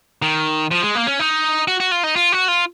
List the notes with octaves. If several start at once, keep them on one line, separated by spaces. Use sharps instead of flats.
D#3
F3
G#3
A#3
C#4
D#4
F#4
F#4
F4
D#4
F4
F#4
F4